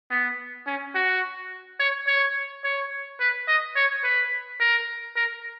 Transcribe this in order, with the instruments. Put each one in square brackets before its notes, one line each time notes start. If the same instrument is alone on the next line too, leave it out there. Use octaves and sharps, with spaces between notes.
[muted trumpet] B3
C#4
F#4
C#5
C#5
C#5
B4
D#5
C#5
B4
A#4
A#4